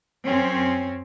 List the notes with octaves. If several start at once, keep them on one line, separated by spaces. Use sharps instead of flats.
F#2 C4 C#4